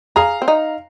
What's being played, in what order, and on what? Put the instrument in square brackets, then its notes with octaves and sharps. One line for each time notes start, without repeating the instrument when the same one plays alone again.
[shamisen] G#4 [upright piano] F5 A#5
[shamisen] C4
D#4